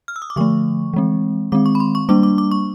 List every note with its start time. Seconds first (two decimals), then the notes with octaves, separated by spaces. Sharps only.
0.08 F6
0.16 E6
0.22 D#6
0.30 D6
0.36 D3 F3 A3 C#6
0.93 E3 G#3 C4
1.52 D#3 G#3 C4 D6
1.66 C#6
1.75 B5
1.80 C6
1.95 C#6
2.09 G3 A#3 D4 D6
2.23 D6
2.38 D6
2.51 C#6